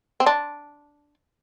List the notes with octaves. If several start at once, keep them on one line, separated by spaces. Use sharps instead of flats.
C4
D4